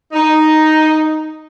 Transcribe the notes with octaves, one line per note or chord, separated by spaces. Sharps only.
D#4